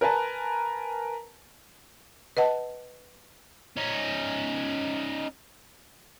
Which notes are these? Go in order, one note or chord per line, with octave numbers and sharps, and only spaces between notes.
A#4 B4 G#5 A5
B4 D#5 F#5 A5
C#4 D#4